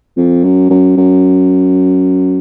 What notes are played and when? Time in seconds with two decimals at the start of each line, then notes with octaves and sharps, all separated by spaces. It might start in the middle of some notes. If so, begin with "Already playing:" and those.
0.17 F2
0.44 F#2
0.70 F#2
0.97 F#2